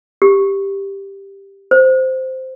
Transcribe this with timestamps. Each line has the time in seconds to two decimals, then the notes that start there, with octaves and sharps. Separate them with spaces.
0.22 G4
1.71 C5